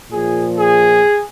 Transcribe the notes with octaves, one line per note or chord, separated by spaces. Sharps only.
A#2 F3 G#4
G#4